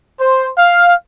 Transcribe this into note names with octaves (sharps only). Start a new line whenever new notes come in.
C5
F5